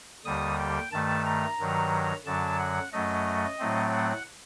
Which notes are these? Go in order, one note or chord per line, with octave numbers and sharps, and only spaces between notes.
D#2 D3 G3 D#6
G5
G2 D#3 A3 A5
A#5
G2 D#3 F#3
F#2 D3 F#3 A5
F#5
F#2 F#3 A3 D#5
A2 F#3 A3 C4
F#5